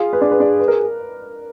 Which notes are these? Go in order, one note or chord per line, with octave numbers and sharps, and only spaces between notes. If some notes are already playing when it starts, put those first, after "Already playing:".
Already playing: F4 G#4 F5
B4
D4 D5
B4
D4 D5
B4
A#4